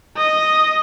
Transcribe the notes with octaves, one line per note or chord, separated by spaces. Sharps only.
D#5